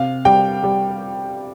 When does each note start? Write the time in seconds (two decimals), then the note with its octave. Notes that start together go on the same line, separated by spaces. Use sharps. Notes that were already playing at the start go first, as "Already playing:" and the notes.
Already playing: C3 F5
0.25 G3 G5
0.63 G3